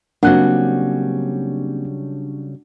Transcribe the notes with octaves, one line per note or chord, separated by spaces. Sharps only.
C#3 F#3 G3 A#3 C4 D4 F#5 F#6